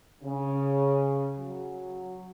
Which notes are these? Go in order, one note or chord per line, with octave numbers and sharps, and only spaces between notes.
C#3
F#3